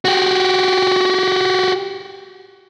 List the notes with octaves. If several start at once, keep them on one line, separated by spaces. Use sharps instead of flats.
F#4 G4